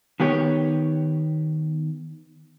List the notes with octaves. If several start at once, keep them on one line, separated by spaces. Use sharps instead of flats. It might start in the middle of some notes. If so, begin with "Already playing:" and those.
D#3 B3 G4 C#5